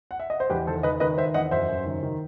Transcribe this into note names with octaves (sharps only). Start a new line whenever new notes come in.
F#5
E5
D#5
C5
E2 G4 B4
D#3 A4 C5
D#3 B4 D#5
D#3 B4 D#5
D#3 C5 E5
E2 D#5 F#5
F#2 C5 E5
F#2
D#3
D#3